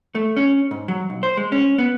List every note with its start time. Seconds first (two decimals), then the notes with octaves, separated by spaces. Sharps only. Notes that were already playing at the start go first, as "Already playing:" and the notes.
0.15 A3
0.37 C#4
0.71 G#2
0.88 F#3
1.10 B1
1.23 C5
1.37 G#3
1.52 C#4
1.78 B3